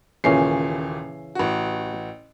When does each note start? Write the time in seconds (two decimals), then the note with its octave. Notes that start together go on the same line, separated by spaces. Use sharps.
0.24 D#1 A#2 C#3 E3 C#4 C7
1.35 A1 F#4